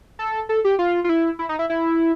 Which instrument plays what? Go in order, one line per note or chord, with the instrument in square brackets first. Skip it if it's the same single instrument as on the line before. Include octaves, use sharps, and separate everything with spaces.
[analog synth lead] A4
A4
G4
F4
F4
E4
E4
D#4
E4
E4